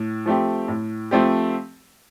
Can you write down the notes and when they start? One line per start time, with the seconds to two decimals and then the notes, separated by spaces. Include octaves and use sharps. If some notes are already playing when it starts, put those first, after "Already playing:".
Already playing: A2
0.26 F3 A3 C4 G4
0.68 A2
1.11 F3 A3 C4 G4